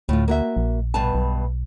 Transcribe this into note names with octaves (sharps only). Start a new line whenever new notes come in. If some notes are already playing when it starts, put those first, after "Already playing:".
D2 A2 F4
A#3 F#4 E5
A#1
G2 B2 A5
B1